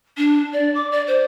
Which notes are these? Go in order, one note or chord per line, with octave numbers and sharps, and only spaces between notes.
D4
D5
D6
D5
C5